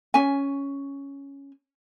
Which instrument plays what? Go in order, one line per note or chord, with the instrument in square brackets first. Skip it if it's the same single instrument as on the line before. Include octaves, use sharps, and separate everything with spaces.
[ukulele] C#4 G#5